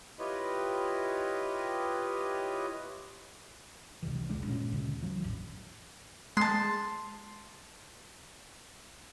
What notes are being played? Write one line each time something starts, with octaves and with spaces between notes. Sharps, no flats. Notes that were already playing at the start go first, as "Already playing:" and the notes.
E4 F4 G4 B4 C#5 D#5
C#2 C3 E3
E1 C2 G#3 D4
G1 A#2 G#3 C#4
D2 C#3
E3 F#3
E1 A1
G#3 A5 C6